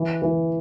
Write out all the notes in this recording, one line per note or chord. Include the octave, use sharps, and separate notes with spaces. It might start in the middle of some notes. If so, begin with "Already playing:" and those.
Already playing: E3
E3